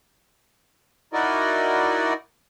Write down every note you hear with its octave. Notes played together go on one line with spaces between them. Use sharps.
D#4 E4 F#4 A#4 D5 D#5